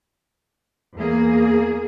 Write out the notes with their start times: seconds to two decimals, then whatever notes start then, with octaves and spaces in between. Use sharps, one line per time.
0.94 E2 A#3 G#4